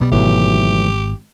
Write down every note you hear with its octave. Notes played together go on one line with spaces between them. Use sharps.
B1 B2 G3 B3
G#1 E3 F#3 A3 G4